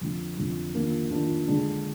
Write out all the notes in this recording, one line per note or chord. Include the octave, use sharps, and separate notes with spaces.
F2 D3 F3
F2 D3 F3
D#3 A#3 D4 F4
D#3 A#3 D4 F4
D3 G#3 D4